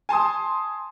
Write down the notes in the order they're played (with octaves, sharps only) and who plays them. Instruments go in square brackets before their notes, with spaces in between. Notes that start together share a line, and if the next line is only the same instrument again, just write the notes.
[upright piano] G#5 A5 C6 D#6